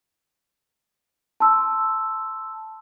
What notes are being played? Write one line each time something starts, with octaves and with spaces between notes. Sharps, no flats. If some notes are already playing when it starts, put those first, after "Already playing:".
A5 C6 E6